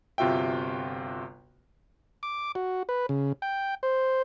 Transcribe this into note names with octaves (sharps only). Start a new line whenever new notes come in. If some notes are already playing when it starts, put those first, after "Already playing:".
G1 C3 F4 F#4 E5 G5
D6
F#4
B4
C#3
G5
C5